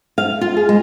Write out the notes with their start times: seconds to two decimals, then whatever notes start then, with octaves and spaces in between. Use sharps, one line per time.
0.18 F5
0.41 F4
0.57 G#4
0.69 G#3